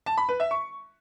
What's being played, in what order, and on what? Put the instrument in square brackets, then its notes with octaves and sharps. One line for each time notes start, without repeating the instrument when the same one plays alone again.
[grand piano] A5
B5
B4
E5
C#6